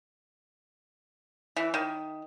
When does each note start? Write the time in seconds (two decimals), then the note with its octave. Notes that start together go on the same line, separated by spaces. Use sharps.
1.57 E3
1.74 D#3